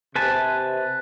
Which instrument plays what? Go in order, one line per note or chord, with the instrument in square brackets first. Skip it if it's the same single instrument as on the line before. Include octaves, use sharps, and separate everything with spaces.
[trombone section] C3 [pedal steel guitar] B4 G#5 A5